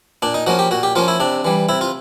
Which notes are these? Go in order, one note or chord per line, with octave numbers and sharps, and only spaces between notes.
A#2 D4
D#4
F3 A#3 C#4 F#4
G4
A#2 F#4
G4
F3 A#3 C#4 F4
E4
C3 D4
E3 G3
C3 E4
F4